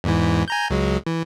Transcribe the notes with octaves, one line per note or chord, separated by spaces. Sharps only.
E2 G#2 E3
G#5 A#5 G6
C#2 F#3 G#3
E3